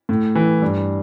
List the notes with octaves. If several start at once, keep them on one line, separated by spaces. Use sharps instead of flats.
A2
E3
G2